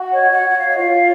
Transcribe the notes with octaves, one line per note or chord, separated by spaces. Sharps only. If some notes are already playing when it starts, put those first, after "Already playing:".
Already playing: F#4
C#5 D#5
F#4 F#5
F#4 F#5
F5
D#5
F4 F5
C#5